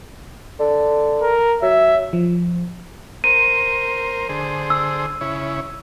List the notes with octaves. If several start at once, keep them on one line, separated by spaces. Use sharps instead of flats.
D3
A#4
F#3 E5
F3
A#4 C5 D#7
D3 G#4 C5
E6
C#3 E4 C#5